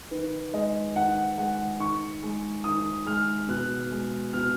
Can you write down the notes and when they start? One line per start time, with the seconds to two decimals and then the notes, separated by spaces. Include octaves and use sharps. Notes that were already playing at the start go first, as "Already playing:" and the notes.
0.11 D#3 B4
0.53 G#3 D#5
0.96 D#3 F#5
1.38 G#3 F#5
1.80 D#3 C#6
2.23 G#3
2.64 D#3 D#6
3.06 G#3 F6
3.48 B2 F#6
3.91 G#3
4.33 B2 F6